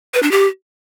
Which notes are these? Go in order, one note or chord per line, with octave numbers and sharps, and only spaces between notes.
B4
D4
G4